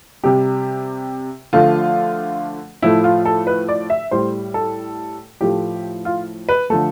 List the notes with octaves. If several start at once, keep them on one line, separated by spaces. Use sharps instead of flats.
C3 G3 G4
D3 F3 A3 F4
A2 F3 A3 E4
F4
A4
B4
D5
E5
A2 G3 C5
A4
A2 F3 A3 G4
F4
B4
D3 F3 A3 A4